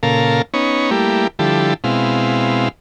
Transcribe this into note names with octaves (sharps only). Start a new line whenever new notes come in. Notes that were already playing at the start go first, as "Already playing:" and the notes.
A#2 C#3 A4 A#4 F5
B3 C#4 D#4 C#5
G3 A3 A#3 E4 G4
D3 F3 G3 E4 G4 A4
B2 G#3 C4 E4 F5